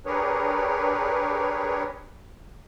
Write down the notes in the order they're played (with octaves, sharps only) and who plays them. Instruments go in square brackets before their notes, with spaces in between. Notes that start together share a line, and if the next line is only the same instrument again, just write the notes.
[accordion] D4 G4 G#4 A#4 B4 C#5